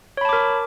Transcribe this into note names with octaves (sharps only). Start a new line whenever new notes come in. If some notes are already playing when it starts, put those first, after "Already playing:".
A#4 C#5 A5 B5 D6